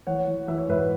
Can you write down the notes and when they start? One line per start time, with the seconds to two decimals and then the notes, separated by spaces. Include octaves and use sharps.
0.07 E3 C#5 F#5
0.27 E3
0.48 E3 E5
0.58 C#5
0.68 G#2 B4 E5